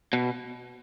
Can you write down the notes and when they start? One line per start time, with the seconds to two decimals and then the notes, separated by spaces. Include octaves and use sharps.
0.13 B2